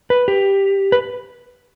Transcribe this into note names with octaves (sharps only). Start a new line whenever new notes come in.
B4
G4
B4